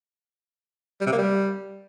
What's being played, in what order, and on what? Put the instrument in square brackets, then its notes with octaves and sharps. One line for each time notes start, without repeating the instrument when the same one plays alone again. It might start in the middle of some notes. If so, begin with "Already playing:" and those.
[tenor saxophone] G3
C3
A#3
G3